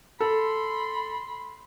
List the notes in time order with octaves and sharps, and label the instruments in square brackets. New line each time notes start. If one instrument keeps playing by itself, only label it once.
[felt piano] A4 [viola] B5 C6